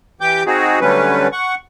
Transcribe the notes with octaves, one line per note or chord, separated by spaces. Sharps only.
E3 G4 G5 D6 G6
C4 D#4 F#4 G#4
D3 F#3 G3 A3 C#4 B4
F#5 C#6